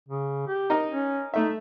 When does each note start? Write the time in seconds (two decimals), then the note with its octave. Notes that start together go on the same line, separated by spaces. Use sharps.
0.09 C#3
0.47 G4
0.70 D#4 A#4 D#5
0.89 C#4
1.34 A3 D#4 E5